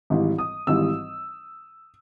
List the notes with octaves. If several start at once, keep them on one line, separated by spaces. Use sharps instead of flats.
G#1 G#2 E3 G3
D#6
G#1 G#2 E3 G3 E6